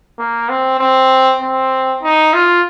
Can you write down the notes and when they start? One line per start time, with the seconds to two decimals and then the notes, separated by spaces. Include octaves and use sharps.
0.19 A#3
0.49 C4
0.79 C4
1.41 C4
2.03 D#4
2.34 F4